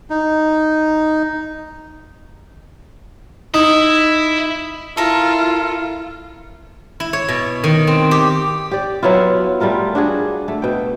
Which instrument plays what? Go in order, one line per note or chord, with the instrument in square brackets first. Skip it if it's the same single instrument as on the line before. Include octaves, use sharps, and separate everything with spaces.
[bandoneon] D#4
[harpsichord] D#4 [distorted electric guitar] E4
[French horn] E4 [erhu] F4 [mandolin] A4 A#4
[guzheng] E4
C#5
B2
D#3
C4
G4
[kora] G4 D5
F#3 B3 E4 F4
G3 A3 F4 A#4
D4 F#4 G#4
A3
B2 G5